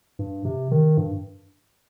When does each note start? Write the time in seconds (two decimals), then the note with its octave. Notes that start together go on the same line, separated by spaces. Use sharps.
0.19 G2
0.45 C3
0.71 D#3
0.98 G2